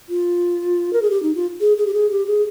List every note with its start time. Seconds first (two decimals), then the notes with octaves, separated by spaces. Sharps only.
0.09 F4
0.93 A#4
1.02 G#4
1.10 G4
1.23 D#4
1.35 F4
1.61 G#4
1.77 G#4
1.87 G4
1.94 G#4
2.11 G4
2.27 G#4